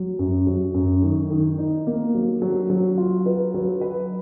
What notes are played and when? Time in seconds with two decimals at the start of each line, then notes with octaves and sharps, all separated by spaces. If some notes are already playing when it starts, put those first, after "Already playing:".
Already playing: F#3
0.19 F#2
0.47 F#3
0.74 F#2
1.02 D#3
1.30 D#3
1.58 D#4
1.87 A#3
2.15 F#3
2.42 F#3
2.70 F#3
2.98 F4
3.26 B4
3.54 F#3
3.81 B4